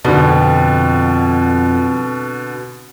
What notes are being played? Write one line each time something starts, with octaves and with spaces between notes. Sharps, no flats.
F2 B2 D3